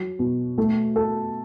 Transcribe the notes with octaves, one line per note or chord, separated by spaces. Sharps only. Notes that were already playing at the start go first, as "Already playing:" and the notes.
Already playing: F#3
B2
A3
A4